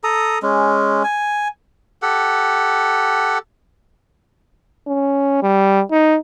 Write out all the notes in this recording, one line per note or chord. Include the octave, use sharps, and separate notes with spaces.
A4 A#5 D#6
G#3 C#4
G#5
G4 A4 F#5
C#4
G3
D#4